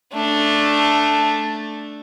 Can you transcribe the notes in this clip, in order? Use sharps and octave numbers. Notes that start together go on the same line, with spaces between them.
A3 D4